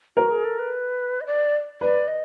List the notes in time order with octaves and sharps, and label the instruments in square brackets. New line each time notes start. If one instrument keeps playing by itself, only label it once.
[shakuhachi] F#4 [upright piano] A#4
[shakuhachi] G#4
A4
B4
D#5
D5
[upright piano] B4 [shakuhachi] D5
[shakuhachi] D#5